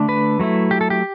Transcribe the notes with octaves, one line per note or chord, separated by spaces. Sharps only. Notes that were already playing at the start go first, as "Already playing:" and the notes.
Already playing: D3 A3 D4
B4
F#3 A3 E4
G4
A4
G4